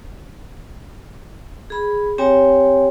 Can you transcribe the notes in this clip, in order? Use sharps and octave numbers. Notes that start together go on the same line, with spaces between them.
G#4 B5
C4 G4 C#5 G5 G#5